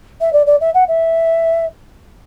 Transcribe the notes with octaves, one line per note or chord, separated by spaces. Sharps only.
E5
D5
D5
E5
F#5
E5